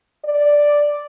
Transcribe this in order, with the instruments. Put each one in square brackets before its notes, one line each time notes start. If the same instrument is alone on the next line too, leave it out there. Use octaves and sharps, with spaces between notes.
[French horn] D5